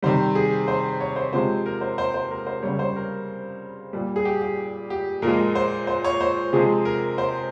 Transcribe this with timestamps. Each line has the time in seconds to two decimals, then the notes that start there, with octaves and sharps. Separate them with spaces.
0.02 C3 D#3 G3 C5
0.35 G#4
0.68 C5
1.00 C#5
1.16 C5
1.33 C3 F3 G#3 C5
1.66 A#4
1.81 C5
1.98 C5
2.14 C5
2.31 A#4
2.47 C5
2.63 C#3 G3 C#5
2.79 C5
2.96 A#4
3.93 A#2 G3
4.16 G#4
4.25 G4
4.41 G4
4.90 G4
5.22 A#2 F3 G#3 A#4
5.55 C5
5.87 C5
6.04 C#5
6.21 C5
6.53 C3 F3 G#3 G#4
6.85 A#4
7.18 C5